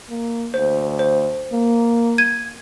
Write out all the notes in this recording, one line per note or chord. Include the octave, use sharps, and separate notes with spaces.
A#3
D2 C5
C5
A#3
G#6 D#7